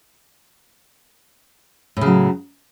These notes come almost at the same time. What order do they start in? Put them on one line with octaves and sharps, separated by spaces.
A2 C#3 F#3